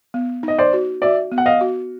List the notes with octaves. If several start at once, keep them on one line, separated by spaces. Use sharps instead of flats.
B3
D#4 D#5
C5 D5
F#4
F#4 D5 E5
B3
F#5
D#5 F5
F#4